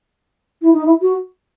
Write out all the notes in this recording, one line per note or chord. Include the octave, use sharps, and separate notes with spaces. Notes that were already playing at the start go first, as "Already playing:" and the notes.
E4
D#4
E4
F#4